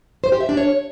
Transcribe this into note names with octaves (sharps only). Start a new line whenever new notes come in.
C5
G4
E5
D4
C#5